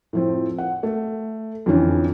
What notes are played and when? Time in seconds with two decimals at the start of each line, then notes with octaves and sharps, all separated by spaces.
0.13 A2 F3 C4
0.58 F#5
0.83 A3
1.66 F2 D3 E3 C#4 D4